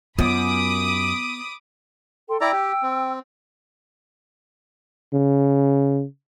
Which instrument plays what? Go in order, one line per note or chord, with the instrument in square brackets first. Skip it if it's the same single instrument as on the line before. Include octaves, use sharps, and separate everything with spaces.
[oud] F#2 [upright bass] B3 F4 [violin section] B5 D6 D#6
[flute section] A4 G5 C6
[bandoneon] E4 D5 A#5 [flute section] G5 E6
[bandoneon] G4
C4
[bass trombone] C#3